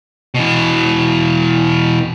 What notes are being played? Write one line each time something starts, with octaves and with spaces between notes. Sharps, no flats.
B2 E3